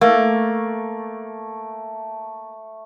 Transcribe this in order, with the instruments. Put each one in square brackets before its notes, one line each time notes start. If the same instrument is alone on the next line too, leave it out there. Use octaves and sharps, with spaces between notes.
[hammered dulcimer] A3 [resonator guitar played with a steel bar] A#3